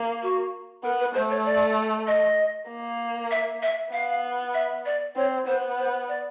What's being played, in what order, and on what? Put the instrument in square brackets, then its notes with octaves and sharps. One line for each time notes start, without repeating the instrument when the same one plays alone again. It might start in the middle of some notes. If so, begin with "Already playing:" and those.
Already playing: [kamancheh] A#3
[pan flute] F#4
[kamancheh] B3 [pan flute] A#4
[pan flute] B4
[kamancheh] A3 [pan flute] C5
[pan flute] C#5
D5
D#5
[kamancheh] A#3
[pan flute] E5
E5
[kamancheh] B3 [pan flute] F5
[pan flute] E5
D5
[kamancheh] C4 [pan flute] C#5
[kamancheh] B3 [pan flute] C5
[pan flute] C5
D5